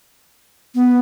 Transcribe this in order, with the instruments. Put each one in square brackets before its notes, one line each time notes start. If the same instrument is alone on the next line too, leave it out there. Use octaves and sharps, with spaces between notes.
[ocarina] B3